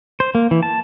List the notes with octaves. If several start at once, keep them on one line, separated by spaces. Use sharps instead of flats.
C5
A#3
E3
A5